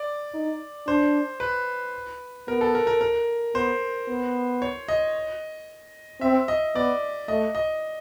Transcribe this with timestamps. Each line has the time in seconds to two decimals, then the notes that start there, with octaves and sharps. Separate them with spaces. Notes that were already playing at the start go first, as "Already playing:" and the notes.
Already playing: D5
0.34 D#4
0.87 D4 C5
1.40 B4
2.47 B3 A#4
2.61 A4
2.75 A#4
2.87 A#4
3.01 A#4
3.54 B3 C5
4.08 B3
4.62 C#5
4.88 D#5
6.21 C4 E5
6.48 D#5
6.75 B3 D5
7.28 A3 D#5
7.55 D#5